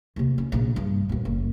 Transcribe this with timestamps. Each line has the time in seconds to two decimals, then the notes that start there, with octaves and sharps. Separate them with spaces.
0.16 D#2 C3
0.38 C#4
0.52 A#1 C3
0.76 G2
1.09 D#2 A#2
1.25 F#1